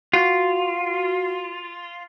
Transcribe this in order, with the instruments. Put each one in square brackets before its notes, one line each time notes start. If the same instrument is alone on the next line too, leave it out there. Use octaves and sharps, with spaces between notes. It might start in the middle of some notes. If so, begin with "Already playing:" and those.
[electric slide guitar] F4 [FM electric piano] F#4